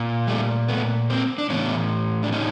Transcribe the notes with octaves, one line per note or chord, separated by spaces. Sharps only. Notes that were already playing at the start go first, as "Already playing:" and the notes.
Already playing: A#2
G3 A3
A3 B3
A#3 C4
D4
A2 E3 B3 C#4
D4
C#4 D#4